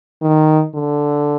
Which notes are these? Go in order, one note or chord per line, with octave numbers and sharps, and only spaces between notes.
D#3
D3